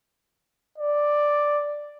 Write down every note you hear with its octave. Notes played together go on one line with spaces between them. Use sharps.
D5